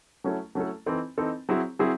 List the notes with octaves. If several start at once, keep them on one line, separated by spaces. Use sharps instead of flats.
F#3 A3 C#4 E4 A4
F#3 A3 C#4 E4 A4
E3 C4 D#4 A4
E3 C4 D#4 A4
F#3 C4 E4 G#4
F#3 C4 E4 G#4